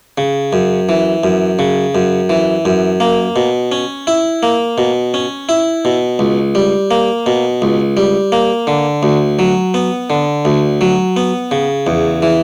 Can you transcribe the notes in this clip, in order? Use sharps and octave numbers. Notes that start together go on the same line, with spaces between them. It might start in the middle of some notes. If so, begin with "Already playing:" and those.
C#3
F#2
E3
F#2
C#3
F#2
E3
F#2
A#3
B2
C#4
E4
A#3
B2
C#4
E4
B2
C#2
G3
A#3
B2
C#2
G3
A#3
D3
D2
F#3
B3
D3
D2
F#3
B3
C#3
E2
E3